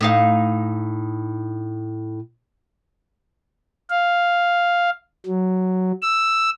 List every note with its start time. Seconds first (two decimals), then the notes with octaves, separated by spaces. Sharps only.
0.01 A2 D#4 F5
3.90 F5
5.26 F#3
6.02 E6